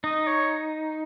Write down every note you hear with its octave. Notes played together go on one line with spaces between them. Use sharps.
D#4 D#5
C#5